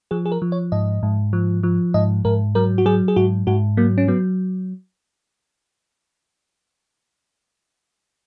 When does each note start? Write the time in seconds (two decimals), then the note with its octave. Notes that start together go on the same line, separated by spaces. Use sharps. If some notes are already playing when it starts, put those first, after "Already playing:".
0.11 F3 G#4
0.26 G#4
0.32 A#4
0.42 F3
0.52 C#5
0.72 G#2 D#5
1.03 G#2
1.33 F3
1.63 F3
1.94 G#2 D#5
2.25 G#2 A#4
2.55 F#3 A#4
2.78 F#4
2.86 F#3 G#4
3.08 G#4
3.16 G#2 F#4
3.47 G#2 F#4
3.77 F#3 A#3
3.98 C#4
4.08 F#3 B3